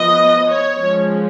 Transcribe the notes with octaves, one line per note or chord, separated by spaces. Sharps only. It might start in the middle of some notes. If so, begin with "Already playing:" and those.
Already playing: F3 B3 D#5
C#5
F3 G#3 C#4